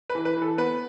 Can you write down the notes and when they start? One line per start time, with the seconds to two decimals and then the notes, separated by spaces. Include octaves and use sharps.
0.10 B4
0.15 E3
0.25 B4
0.37 E3
0.42 A4
0.58 B3 B4